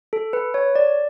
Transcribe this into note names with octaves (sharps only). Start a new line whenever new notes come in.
A4
B4
C#5
D5